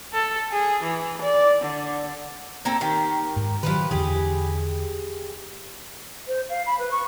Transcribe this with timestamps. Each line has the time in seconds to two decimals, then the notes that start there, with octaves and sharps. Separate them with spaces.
0.14 A4
0.52 G#4
0.83 E3
1.22 D5
1.62 D3
2.65 A#3 C4 A4
2.81 D#3 G4
3.36 G#2
3.63 D#3 F3 F#3 G4 B4
3.91 E2 D3 E3 G4 G#4
6.27 C5
6.49 F5
6.66 B5
6.79 B4
6.91 C#6